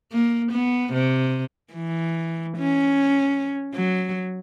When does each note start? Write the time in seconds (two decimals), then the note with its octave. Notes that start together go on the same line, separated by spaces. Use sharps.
0.12 A#3
0.52 B3
0.93 C3
1.73 E3
2.57 C#4
3.75 F#3